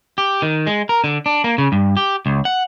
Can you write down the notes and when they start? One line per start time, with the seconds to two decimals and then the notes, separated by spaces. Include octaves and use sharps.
0.18 G4
0.42 D#3
0.67 G#3
0.89 A#4
1.04 D3
1.26 D4
1.44 A#3
1.58 C#3
1.72 G2
1.97 G4
2.26 C#2
2.45 F#5